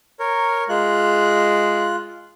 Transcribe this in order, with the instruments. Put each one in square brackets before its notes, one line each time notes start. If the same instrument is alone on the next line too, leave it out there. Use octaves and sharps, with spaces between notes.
[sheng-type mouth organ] A#4 C#5
[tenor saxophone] G#3 [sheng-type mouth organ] F4 F#6